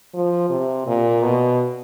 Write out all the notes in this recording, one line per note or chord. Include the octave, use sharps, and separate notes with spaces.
F3
C3
A#2
B2